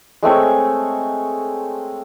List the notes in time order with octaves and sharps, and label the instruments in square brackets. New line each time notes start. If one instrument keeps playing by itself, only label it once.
[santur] G#3 A3 C4 C#5